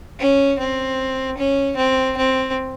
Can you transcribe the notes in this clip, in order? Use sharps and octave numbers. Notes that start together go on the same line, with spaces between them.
C#4
C4
C#4
C4
C4